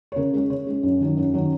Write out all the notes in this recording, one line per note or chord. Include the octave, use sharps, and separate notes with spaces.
C#5
C#3 A#4
G#3 C#4
C#3 C#5
G#3 C#4
F#2
D#3 F#3 C#4
F#2
D#3 F#3 C#4